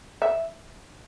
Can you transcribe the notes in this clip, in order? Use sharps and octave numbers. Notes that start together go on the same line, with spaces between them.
E5